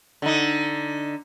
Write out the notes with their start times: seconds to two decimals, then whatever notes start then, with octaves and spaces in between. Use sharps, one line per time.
0.22 D3 D#4